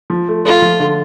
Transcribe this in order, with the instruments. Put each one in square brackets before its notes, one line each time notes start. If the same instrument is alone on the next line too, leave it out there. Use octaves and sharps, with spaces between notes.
[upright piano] F3
A3
[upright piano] A3 [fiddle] F4
[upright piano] F3
D3